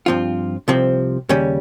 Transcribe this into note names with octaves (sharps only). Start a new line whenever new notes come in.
G2 F3 C4 F4
C2 C3 F3 C4
D#2 C#3 G3 C#4